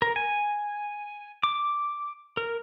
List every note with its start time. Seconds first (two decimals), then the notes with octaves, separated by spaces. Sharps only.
0.02 A#4
0.16 G#5
1.43 D6
2.37 A#4